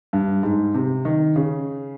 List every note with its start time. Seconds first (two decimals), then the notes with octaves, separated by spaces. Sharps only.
0.13 G2
0.43 G#2
0.74 C3
1.05 D#3
1.36 C#3